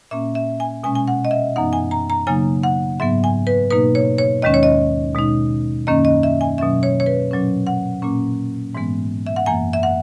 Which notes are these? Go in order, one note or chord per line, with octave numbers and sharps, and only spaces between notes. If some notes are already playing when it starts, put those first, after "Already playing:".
A#2 A#3 C#4 E5
E5
G#5
B2 G#3 C#4 G#5
G#5
F#5
D#5
E5
F#2 E3 B3 D#4 F#5
G#5
A#5
A#5
C#3 F#3 A#3 D#4 G#5
F#5
G#2 F#3 B3 E5
G#5
B4
B2 A#3 D#4 B4
C#5
C#5
D#2 D#3 G#3 C#4 D#5
C#5
D#5
B2 G#3 D#4
F#2 D#3 A#3 C#4 D#5
D#5
E5
G#5
B2 F#3 C#4 E5
C#5
C#5
B4
A#2 F#3 C#4
F#5
A#2 A#3 C#4
G#2 E3 G#3 B3
E5
F#5
F#2 E3 A#3 G#5
E5
F#5